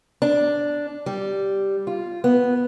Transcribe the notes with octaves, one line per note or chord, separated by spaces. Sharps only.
D4
G3
F4
B3